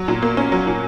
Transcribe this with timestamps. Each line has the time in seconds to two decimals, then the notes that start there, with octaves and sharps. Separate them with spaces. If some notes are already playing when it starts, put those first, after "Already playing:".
Already playing: F#3
0.08 A#2
0.22 A#3
0.37 C#4
0.52 F#3
0.67 A#2